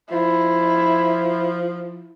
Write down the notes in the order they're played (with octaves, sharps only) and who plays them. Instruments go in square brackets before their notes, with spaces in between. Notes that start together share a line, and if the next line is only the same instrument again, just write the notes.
[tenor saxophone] F3 [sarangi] E4